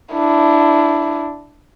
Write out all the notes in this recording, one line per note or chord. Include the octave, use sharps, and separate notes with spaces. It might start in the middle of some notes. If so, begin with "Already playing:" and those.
D4 E4